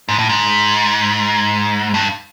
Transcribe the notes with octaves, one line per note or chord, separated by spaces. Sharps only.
G#2
A2
G#2
G2